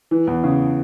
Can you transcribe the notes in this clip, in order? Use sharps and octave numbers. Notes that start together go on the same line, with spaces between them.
E3
E2
C#3